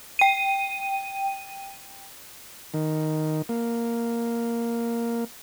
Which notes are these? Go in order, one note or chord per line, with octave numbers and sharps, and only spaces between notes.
G5 D#7
D#3
A#3